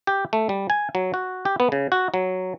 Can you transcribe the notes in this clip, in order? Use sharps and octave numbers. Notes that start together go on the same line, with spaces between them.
G4
A3
G3
G#5
F#3
F#4
G4
B3
C#3
F#4
F#3